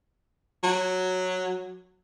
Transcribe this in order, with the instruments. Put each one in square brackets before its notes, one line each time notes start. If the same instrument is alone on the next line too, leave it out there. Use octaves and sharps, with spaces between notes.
[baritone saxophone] F#3